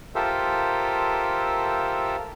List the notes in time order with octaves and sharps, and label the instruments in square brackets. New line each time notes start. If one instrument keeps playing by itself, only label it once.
[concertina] F4 G4 A4 A#4 C5 E5